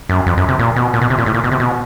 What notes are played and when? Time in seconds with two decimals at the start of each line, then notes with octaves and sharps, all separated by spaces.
0.09 F#2
0.26 F2
0.37 F#2
0.48 C3
0.59 A#2
0.76 B2
0.93 A#2
1.02 B2
1.10 C3
1.18 A#2
1.26 A2
1.34 A#2
1.44 B2
1.52 C3
1.60 B2